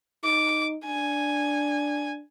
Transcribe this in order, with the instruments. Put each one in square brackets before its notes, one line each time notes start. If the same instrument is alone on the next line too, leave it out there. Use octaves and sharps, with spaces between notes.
[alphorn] D#4 [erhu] D6
[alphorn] D4 [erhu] G#5